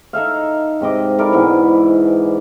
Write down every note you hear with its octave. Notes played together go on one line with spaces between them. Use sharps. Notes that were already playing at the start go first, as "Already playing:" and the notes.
D#4 A4 E5 F5
G#2 C3 D#5 D6
E4 A4 A#4 D5
G#2 B2 E3